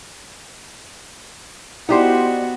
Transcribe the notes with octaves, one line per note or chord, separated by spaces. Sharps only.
B3 D#4 E4 F#4 G4 C5 D5 C6